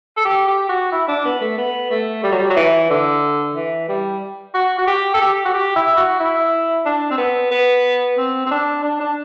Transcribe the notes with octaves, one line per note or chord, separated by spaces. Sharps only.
A4
G4
G4
F#4
E4
D4
B3
A3
B3
A3
G3
F#3
G3
F#3
E3
D3
E3
G3
F#4
F#4
G4
A4
G4
F#4
G4
E4
F#4
E4
D4
C4
B3
B3
C4
C4
D4
D4
D4